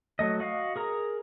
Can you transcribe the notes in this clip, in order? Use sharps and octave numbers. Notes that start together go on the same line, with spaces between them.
F#3 A3 D#5
F#4 D#5 F5
G#4 A#4 A#5